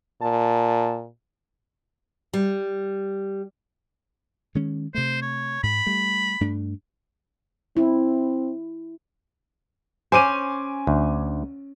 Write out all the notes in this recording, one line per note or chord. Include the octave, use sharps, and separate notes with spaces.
A#2 A5
G3
D#3 G#3 C#4
C3 A3 C5
C#5
G#2 B5
G3 A3
G2 A3 D4
C4 E4
C#4 C5 G#5 D6 D#7
D2